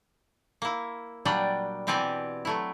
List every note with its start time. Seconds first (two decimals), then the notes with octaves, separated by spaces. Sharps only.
0.62 A#3 E4
1.25 A#2 F#3 G3 D4 D5 G5
1.87 B2 E3 C4 G4 D5 G#5
2.45 F#3 A3 E4